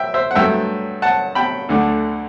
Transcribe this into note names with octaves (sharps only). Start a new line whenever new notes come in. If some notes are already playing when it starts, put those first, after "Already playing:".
Already playing: E5 G5
C5 E5
F#5
G2 F#3 A3 E5 G5
F#5 A5
G5 B5
D2 D3 A3